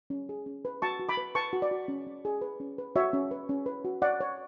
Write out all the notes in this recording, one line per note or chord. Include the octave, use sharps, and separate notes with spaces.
C#4
G#4
C#4
B4
F#4 A5 C#6
F#4
B5 D6
B4
B4 A5 C#6
F#4
D5
F#4
C#4
C#4
G#4
B4
C#4
B4
F#4 C#5 E5
C#4
B4
C#4
B4
F#4
C#5 D5 F#5
C#5